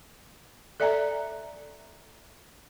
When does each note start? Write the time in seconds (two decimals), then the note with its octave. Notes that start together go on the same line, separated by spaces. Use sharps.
0.80 A4 D5 E5 G#5 A#5